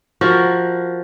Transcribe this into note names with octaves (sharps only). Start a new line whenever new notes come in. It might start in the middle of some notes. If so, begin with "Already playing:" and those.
F3 F#4 A#4